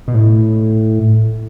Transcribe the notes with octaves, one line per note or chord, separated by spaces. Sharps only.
B2
A2